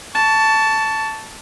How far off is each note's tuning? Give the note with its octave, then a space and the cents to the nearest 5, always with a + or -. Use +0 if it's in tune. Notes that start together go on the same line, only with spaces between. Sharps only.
A5 +0 C#6 +30